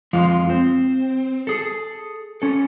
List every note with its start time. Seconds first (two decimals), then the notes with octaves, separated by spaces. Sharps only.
0.13 F2 F3 G#3 F4
0.50 C4
1.47 G#4 A4
2.42 C#4 A4